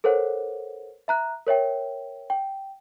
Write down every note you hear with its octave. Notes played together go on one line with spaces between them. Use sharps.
A4 A#4 C5 C#5 F#5
E5 A#5 F#6
A#4 C#5 E5 G5
G5